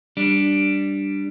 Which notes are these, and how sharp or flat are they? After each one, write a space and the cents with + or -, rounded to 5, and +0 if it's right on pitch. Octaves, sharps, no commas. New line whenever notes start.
G3 +0 D4 +0